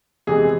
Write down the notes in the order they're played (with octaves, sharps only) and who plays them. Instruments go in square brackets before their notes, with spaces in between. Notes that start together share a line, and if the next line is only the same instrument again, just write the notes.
[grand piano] E2 C3 E3 G#3 [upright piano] G#4